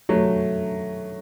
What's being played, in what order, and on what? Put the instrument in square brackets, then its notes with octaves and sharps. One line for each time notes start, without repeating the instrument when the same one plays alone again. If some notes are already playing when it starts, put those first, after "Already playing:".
[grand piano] F#3 A3